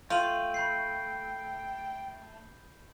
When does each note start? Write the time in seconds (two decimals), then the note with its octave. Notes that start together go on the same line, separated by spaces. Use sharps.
0.10 A3 F4 G5 G6 D#7 F#7
0.54 B5 G6 C7